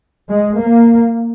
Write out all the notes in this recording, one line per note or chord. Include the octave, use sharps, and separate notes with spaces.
G#3
A#3